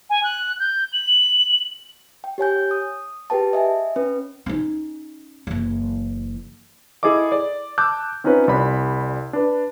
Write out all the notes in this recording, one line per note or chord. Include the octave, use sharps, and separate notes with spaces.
G#5
F#6
G6
F#7
G5
G4 C#5 G#5 G6
D#6
G4 G#4 B4 G5 A5
D#5 E5 G#5
C#4 B4
C#4 D#4
F#1 E3
E4 G#4 A4 D#5 D6
D5
A5 D6 E6 F#6 G6
C4 C#4 D#4 F4 B4 C#5
C2 D5 B5
D4 B4